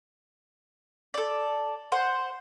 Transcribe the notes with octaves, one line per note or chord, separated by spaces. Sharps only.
A4 D5
C5 F#5